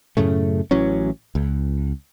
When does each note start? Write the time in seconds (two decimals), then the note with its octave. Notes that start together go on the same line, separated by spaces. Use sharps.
0.17 F#2 A2 C#3 A3
0.71 A1 E3 F#3 C#4
1.35 C#2